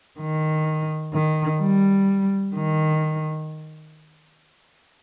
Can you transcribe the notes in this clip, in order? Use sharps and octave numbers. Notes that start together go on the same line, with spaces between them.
D#3
D#3
G3
D#3